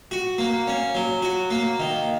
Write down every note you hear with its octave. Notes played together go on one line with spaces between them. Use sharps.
F#4
A#3
C#4
F#3
F#4
A#3
D#3